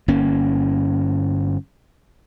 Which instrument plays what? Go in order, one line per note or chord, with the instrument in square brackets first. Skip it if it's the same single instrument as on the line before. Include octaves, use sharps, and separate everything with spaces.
[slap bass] G1 A#3 C#4